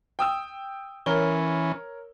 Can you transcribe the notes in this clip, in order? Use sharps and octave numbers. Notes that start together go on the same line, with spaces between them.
G5 D#6 E6
E3 C#4 A#4 C#5 G7